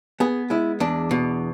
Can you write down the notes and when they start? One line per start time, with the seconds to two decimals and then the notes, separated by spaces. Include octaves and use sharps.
0.20 B3 G#4
0.50 G#3 E4
0.80 E2 D4
1.11 B2